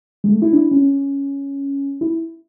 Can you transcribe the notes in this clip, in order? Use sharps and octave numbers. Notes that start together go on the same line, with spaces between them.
G#3
A3
E4
D4
E4
C#4
E4